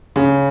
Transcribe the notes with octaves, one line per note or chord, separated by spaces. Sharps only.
C#3